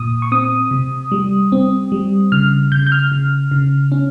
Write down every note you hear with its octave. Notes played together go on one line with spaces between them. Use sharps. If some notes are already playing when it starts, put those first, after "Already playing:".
Already playing: A#2 D#6
C#6
C4 D#6
C3
G3
C4
G3
C#3 F6
C#3 G6
G6
F6
C#3
C#3
C#4